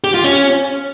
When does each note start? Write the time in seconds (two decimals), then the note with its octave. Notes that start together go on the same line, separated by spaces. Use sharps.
0.04 G4
0.14 F4
0.24 C#4